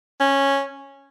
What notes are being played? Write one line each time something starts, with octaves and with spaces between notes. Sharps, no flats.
C#4